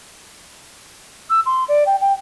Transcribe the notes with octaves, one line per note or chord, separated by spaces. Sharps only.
E6
C6
D5
G5
G5